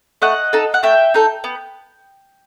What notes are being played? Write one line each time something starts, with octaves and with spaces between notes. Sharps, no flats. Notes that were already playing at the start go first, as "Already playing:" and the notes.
A3 D#5 F#5
D#4 A4
F#5
A3 E5 G5
D#4 A4
B3